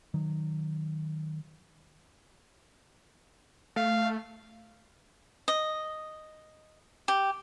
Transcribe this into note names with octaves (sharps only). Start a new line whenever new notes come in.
D#3 F#3
A3 F5
D#5
G4